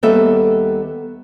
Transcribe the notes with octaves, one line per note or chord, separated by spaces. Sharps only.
D#2 G3 B3 A4 E5